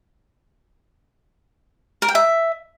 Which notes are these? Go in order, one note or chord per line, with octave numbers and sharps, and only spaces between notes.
A#4
G5
E5